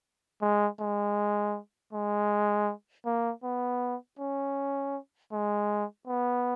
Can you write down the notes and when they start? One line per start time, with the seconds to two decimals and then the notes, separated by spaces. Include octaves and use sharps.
0.42 G#3
0.80 G#3
1.93 G#3
3.06 A#3
3.43 B3
4.19 C#4
5.32 G#3
6.07 B3